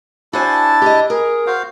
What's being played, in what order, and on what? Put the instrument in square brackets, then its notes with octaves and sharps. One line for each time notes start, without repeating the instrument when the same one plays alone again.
[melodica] D4 E4 A5 [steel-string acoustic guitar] F#4 C5 G#5
[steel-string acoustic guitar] G4 D#5
[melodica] G#4 [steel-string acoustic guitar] A#4
[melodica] F#4 C5 F5